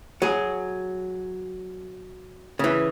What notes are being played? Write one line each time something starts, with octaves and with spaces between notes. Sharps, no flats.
F#3 G#4
C#3 E3